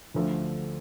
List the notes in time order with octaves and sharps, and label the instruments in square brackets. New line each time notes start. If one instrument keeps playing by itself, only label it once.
[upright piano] D2 D3 F3 A3